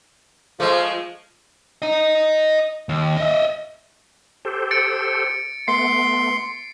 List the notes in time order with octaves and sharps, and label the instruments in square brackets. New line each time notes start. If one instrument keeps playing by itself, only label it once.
[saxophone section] F3 [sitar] G#3 A3
[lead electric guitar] D#5 A#5
D#2
D#5 E5
[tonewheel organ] G4 A4 C5
[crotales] A6 C#7 D7
[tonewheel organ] A3 B3 [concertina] C6 [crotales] C7